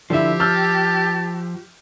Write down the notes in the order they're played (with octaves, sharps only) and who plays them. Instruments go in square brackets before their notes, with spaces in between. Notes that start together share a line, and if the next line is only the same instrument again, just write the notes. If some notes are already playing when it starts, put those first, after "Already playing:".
[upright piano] D3 E4 [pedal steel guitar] F3 E5 [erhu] G4
[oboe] A5 [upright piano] E6 F6 G6